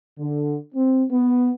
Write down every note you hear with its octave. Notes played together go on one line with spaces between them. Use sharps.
D3
C4
B3